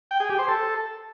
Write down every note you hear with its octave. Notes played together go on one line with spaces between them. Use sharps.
G5
G#4
G4
C5
A4